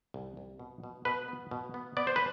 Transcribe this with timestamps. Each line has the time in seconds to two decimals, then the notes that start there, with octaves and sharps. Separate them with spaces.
0.14 C2
0.37 C2
0.59 B2
0.84 B2
1.05 B2 B4
1.28 B3
1.51 B2
1.74 B3
1.97 B3 D5
2.07 C5
2.16 B4